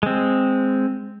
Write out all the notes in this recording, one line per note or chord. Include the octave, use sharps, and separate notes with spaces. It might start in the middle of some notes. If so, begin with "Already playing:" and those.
G#3 C4